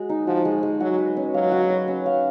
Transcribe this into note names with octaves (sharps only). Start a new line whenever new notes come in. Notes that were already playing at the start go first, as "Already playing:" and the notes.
Already playing: G#3 F#4
D#4
F3 F#4
G#3
G#3
F#3 F#4
B4
C#4
F#3 F5
F#4
B4
C#4
F5